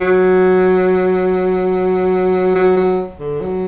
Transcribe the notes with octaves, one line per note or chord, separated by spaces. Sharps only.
F#3
F#3
F#3
D3
F#3